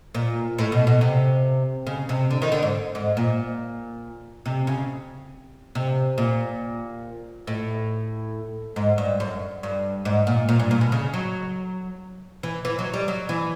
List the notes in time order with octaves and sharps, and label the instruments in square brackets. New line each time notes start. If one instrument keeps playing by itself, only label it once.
[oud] A#2
A2
B2
B2
C3
C#3
C3
D3
D#3
D3
G#2
G#2
A#2
C3
C#3
C3
A#2
A2
G#2
G2
F#2
G2
G#2
A#2
A#2
G2
A#2
B2
C#3
F#3
E3
E3
F#3
G3
F#3
E3